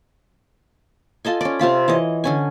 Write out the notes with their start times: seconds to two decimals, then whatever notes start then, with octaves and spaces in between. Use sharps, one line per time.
1.25 F4 A4 D#5 G#5
1.41 C#4 D5
1.59 C3 C4 F4 B5
1.88 E3 C#5 D#5
2.24 D3 C#4 G#5